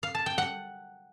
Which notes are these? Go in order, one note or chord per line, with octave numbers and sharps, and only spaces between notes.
F5
A5
G5
F#5